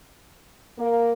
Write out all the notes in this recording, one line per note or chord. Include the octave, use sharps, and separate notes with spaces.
A#3